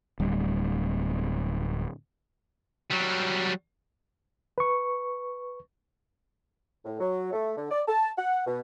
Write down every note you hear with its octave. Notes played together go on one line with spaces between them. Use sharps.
D1 G3
F#3 G3
B4 C#6
A2
F#3
A3
D3
D5
A5
F#5
B2